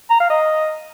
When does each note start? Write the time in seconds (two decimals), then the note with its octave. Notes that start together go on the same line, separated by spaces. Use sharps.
0.10 A#5
0.20 F5
0.30 D#5